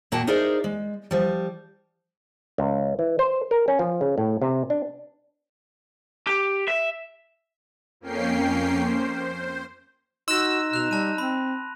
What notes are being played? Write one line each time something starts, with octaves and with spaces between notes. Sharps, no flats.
A#2 A#3 F#4 G5 A5
D#4 G#4 A#4 C5 D5 E5
G#3
F3 G3
C#2
E3
C5
A#4
C#4
F3
C#3
A2
C3
D4
G4
E5
F2 A#3 C#4 G5 C7
C5
D#4 F#4 C6 E6 F#6 A#6
B2 F#6 F7
G3 A5 D#7
C4 B5